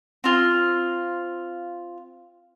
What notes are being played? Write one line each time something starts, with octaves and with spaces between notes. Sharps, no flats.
C4 F4